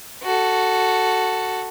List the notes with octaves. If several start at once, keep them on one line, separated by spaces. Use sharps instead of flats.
F#4 A4